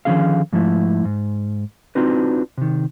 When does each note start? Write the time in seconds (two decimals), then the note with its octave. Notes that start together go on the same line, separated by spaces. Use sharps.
0.05 D3 D#3 F3 C#4 G#4 F5
0.53 G#2 F3 A3 E4
1.05 G#2
1.95 C4 D4 D#4 F4 F#4 B4
2.58 C3 D#3